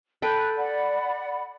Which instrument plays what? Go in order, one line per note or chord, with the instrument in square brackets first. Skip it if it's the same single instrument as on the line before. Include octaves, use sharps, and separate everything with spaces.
[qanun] A4 B4 G5 [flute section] F#6
[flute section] D5 F#5 B5